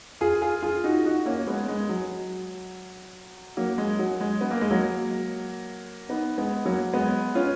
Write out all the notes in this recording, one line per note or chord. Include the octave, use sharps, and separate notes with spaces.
F4 G#4
F4 G#4
F4 G#4
D#4 F#4
D#4 F#4
A#3 C#4
G#3 B3
G#3
F#3
F#3 A#3
G#3
F#3
G#3
B3
A#3
G#3
F#3 A#3
B3 D#4
G#3 B3
F#3 A#3
G#3 B3
C#4 F4